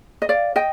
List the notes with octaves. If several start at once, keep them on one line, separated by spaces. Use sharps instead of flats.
D#5
D5 F5
D#5 G5